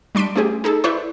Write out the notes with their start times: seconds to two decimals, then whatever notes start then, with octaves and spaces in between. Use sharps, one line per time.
0.15 G3 D4 C6 B6 D7
0.35 A3 C#4 G4 G#4
0.64 D#4 G#4 A4
0.84 E4 B4 C5 D5 B5 C#6